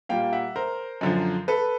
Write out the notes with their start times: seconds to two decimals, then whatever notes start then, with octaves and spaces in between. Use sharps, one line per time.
0.09 A#2 G3 A#3 F5 G5
0.33 E5 F#5
0.56 A#4 C5
1.01 F#2 D3 F3
1.48 A4 B4